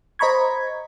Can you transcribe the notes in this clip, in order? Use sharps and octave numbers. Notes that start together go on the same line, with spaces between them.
C5 D#5 A#5 B5 C#6 G#6